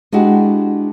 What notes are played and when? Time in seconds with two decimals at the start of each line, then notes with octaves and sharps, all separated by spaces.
0.12 G#3 D4 E4 F#4 G4